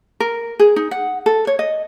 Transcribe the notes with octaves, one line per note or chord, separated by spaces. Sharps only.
A#4
G#4
D#4
F#5
A4
C#5
D#5